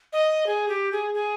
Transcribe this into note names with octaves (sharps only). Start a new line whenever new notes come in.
D#5
G#4
G4
G#4
G#4